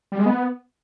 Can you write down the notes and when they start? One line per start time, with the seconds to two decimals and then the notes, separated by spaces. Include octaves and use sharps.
0.12 G3
0.19 G#3
0.26 B3